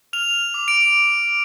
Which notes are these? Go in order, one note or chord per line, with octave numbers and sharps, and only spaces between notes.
F6 F7
F6
D6
D7